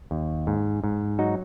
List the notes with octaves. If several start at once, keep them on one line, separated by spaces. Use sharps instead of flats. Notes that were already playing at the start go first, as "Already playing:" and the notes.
D#2
G#2
G#2
F#3 D#4 F#4